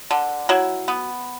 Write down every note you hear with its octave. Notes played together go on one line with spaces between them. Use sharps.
D3
F#3 E4
B3